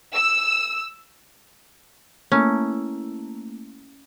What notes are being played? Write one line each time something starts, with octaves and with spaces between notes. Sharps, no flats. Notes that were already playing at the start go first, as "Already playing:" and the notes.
E6
A3 A#3 C#4 E4